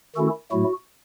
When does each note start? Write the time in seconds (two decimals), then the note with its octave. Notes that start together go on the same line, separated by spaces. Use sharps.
0.16 D#3 A3 C#4 E4 F#4 A4
0.52 A2 F#3 A3 E4 F#4